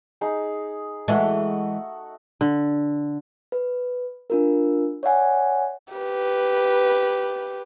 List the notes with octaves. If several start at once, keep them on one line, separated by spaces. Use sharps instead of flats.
D#4 G#4
E3 G#3 A3 F#4
D3
B4
D4 F4 A#4
C#5 D5 E5 F#5 G#5
G4 B4